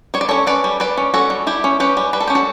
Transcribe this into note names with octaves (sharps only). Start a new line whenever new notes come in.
G3 C#5
D5
C#4 A4 C#5
C#4 B4 D5
G3
G3 B4 D5
C#4
C#4 F#4 A4
G3
G3 E4 G4
C#4
C#4 G4 B4
G3
G3 B4
A4
C#4 G4
F#4 A4